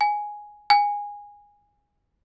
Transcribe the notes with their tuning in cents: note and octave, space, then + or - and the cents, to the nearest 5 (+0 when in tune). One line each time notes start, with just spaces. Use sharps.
G#5 +0
G#5 -15